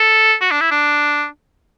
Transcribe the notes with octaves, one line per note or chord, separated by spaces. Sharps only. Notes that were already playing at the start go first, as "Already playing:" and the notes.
Already playing: A4
F#4
D4
E4
D4